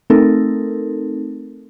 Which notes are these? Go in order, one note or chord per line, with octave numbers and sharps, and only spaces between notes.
A3 C4 D#4 A4 A#4